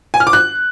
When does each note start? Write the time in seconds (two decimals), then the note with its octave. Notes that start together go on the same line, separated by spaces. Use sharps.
0.14 G#5
0.20 F6
0.27 D6
0.33 F#6